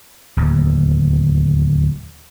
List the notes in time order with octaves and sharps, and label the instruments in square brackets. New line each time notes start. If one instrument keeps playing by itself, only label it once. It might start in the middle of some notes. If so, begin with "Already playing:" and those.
[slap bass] D1 D#2